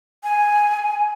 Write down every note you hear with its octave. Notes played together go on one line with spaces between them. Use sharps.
G#5